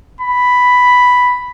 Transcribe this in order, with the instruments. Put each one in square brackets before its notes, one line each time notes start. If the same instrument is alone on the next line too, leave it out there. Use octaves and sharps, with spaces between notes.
[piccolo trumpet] B5